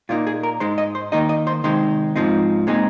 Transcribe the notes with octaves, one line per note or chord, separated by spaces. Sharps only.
A#2 A#3 D#4 F4
G#4
A#4
G#2 G#3 D#4 C5
D#5
C5
D#3 A#3 D#4 D#5
D#5
C5
C3 D#3 G#3 D#4 C5
G#2 F3 C4 D#4
A#2 G#3 C4 D#4